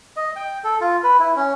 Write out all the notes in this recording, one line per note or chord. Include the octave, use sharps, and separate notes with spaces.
D#5
G5
A4
F4
B4
E4
C#4